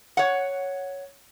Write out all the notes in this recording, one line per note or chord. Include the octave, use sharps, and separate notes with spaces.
C#5 F#5